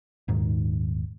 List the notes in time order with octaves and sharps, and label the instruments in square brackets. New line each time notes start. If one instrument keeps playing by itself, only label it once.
[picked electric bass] D#1 G#2 D#3